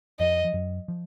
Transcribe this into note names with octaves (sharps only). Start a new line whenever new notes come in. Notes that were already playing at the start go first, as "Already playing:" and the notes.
F2 F3 D#5
F3
F#2 F#3
F3